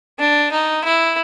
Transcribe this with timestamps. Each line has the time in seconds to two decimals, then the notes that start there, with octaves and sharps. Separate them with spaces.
0.19 D4
0.51 D#4
0.84 E4